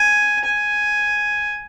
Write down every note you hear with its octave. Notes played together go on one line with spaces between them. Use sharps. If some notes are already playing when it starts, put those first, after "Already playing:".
Already playing: G#5
G#5